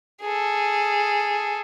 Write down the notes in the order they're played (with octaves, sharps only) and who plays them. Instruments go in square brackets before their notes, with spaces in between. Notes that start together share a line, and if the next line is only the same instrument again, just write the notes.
[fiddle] G#4 A4